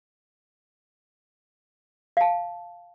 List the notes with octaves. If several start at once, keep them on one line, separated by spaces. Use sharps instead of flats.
F5 A5